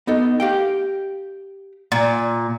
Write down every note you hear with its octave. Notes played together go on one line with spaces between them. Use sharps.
B3 D#4 A4
G4 F5 G5
A#2